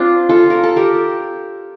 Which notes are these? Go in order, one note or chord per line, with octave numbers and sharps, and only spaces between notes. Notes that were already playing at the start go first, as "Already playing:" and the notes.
Already playing: C4 D4 F4
F4 A4
A#4
A4
G4 A#4